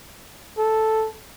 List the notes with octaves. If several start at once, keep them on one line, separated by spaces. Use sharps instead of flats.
A4